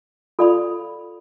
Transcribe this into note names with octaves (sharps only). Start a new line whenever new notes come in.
F4 A4 D5 F5 B5